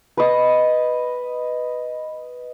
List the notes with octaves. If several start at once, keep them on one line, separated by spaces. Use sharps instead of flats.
B4 D#5